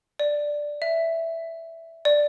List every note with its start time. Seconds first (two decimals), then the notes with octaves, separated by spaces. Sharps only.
0.20 D5
0.82 E5
2.05 D5